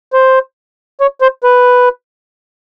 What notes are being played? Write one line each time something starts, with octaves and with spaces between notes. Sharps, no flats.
C5
C#5
C5
B4